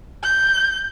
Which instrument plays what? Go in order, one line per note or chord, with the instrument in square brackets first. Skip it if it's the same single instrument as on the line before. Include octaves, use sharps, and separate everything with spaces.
[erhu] G6